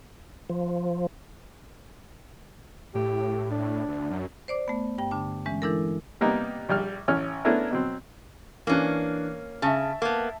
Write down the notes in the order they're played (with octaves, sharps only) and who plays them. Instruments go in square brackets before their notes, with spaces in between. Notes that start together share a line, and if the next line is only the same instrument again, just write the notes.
[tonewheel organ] F3
[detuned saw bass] A2 [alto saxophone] G4
[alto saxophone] D4
[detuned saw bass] D2
F#2
[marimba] C5 D5 D6
A3 B3
G2 G5
D3 D4 A5
E3 G#3 C#4
E3 G#3 D4 E4 A4 A#4
[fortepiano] C3 G3 A#3 B3 D#4
A#1 G3 F6
A1 C#4 F6
A3 B3 C#4 D4 E4 A#4
B2 F#3 C4
[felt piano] E3 D4 [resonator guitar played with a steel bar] A#3 C#4
[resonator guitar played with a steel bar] C#3 [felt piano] E5 A5
[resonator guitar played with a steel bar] A#3 B3